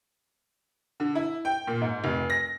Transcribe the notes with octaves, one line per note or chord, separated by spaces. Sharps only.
D3
E4
G5
A#2
G#2
F1
A#6